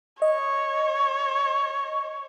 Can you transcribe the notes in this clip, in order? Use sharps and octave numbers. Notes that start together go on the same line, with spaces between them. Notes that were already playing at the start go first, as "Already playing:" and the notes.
C#5 D#5